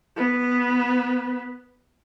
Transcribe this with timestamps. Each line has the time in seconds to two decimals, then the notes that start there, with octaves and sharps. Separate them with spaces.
0.16 B3 B4